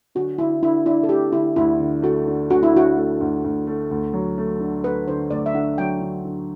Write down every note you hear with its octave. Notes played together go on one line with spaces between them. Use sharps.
D3 F#4
D3 E4
D3 E4
D4 E4
A4
A3 G4
D3 E4
D2 E4
D3
A3 F#4
D3
D2 F#4
E4
D3 F#4
A3
D2
D2
A3
D2
F#3
A3
D3
A3 B4
D3 C5
D2 D5
E5
D3 F#5
F#3 G5
D3
D3